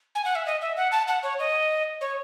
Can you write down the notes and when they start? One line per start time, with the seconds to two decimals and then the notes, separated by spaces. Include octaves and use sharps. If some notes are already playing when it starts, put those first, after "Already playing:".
0.15 G#5
0.25 F#5
0.35 E5
0.46 D#5
0.61 E5
0.77 F#5
0.92 A5
1.08 F#5
1.23 C#5
1.39 D#5
2.01 C#5